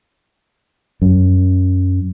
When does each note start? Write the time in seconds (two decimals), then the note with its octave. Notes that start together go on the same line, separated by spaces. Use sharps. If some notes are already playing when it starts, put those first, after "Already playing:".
1.02 F#2